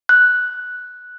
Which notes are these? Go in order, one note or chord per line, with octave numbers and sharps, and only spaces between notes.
F#6